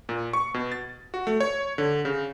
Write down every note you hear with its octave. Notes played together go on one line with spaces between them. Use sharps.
A#2
C#6
B2
A6
F#4
A3
C#5
D3
C#3